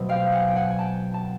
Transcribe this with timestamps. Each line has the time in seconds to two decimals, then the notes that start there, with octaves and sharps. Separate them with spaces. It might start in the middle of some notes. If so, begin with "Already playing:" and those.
Already playing: B2 F#3 A3 C4
0.09 F5 G5
0.32 F#5 G#5
0.48 G5
0.56 F#5 G#5
0.70 G#5
0.79 G5 A5
1.14 A5